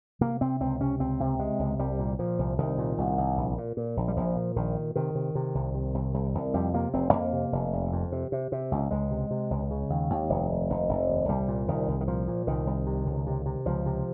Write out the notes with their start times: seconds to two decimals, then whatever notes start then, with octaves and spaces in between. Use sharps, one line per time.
0.21 C3 A#3
0.41 C3 C4
0.61 C#2 C4
0.80 C3 C#4
1.00 C#2 C4
1.20 C3
1.39 C3 G#3
1.59 C#2
1.79 C2 G3
1.99 A#2
2.19 A#2 F3
2.39 C2
2.58 C2 D#3
2.78 A#2
2.98 C2
3.18 C2
3.37 A#1
3.58 A#2
3.77 A#2
3.97 A#1
4.08 G3
4.16 A#1 F3
4.36 A#2
4.56 A#1 D#3
4.76 A#2
4.95 C3 D#3
5.15 C3
5.35 C3
5.55 C2
5.75 C3
5.94 C2
6.14 C2
6.35 C2
6.54 F2 G3
6.74 C3 A#3
6.94 F1 C4
7.13 F2 A#3
7.33 C3
7.52 F1
7.73 F1
7.92 F2
8.12 C3
8.32 C3
8.52 C3
8.72 C#2
8.91 C#2 G#3
9.11 C3
9.31 C3
9.51 C#2
9.71 C#3
9.90 D#2
10.10 D#2
10.29 F1
10.49 D#2
10.69 F1
10.88 F1
11.09 D#2
11.29 C2 G3
11.48 A#2
11.68 C2 D#3
11.88 C2
12.01 D#3
12.08 A#2 F3
12.28 A#2
12.47 C2 D#3
12.67 C2
12.86 C3
13.07 C#2
13.27 C3
13.46 C3
13.66 C#2 F3
13.86 C3